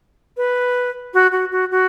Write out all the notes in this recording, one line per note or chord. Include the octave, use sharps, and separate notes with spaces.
B4
F#4
F#4
F#4
F#4